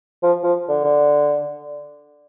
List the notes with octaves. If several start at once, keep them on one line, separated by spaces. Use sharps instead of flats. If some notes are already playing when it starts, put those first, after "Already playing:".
F3
F3
D3
D3